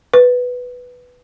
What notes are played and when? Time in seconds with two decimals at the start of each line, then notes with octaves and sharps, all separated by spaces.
0.13 B4